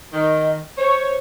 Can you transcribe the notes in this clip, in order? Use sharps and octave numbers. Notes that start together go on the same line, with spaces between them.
D#3 D#5
C5 C#5